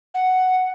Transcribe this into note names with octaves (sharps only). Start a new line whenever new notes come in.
F#5